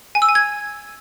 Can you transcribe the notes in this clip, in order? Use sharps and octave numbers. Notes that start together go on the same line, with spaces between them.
G#5
E6
G#5
G#6